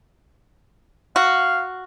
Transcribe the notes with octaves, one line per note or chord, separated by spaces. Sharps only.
F#4 F5